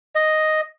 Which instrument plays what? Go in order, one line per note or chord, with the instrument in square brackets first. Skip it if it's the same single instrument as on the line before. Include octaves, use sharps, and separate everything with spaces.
[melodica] D#5